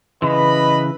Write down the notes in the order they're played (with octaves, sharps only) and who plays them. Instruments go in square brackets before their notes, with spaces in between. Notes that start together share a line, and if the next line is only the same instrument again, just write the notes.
[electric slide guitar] C#3 E3 [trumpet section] B4 D#5 B5